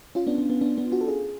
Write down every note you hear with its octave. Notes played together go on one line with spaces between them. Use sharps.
C#4 F4
B3 D4
B3
B3
B3 D4
B3 D4
D4 F#4
A4
F4 G#4